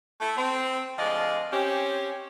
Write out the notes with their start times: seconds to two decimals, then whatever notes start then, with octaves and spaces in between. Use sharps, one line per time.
0.21 A3 E4
0.37 C4
0.98 D2 F3 G#3 D5 D#5 F5
1.52 C4 C#4 G4